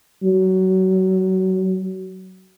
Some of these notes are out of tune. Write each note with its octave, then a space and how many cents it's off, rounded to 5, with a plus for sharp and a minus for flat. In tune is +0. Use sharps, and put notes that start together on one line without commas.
F#3 +25